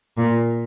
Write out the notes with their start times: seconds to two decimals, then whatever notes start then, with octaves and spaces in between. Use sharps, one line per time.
0.17 A#2